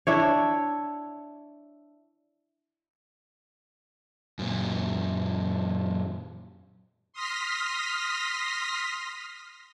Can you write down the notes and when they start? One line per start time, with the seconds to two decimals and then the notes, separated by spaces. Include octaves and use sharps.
0.07 D4 E4 C#5
4.39 F#2 A#2
7.13 C6 D#6 F6 A#6 B6